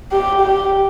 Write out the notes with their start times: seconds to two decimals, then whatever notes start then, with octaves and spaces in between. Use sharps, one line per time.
0.12 G4
0.41 G4